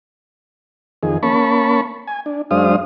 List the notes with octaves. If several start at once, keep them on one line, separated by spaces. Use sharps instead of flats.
F2 D#3 G#4
A#3 C#4 A5 B5 C#6
G#5
D4
F#2 G#3 D4 C5 F5 D#6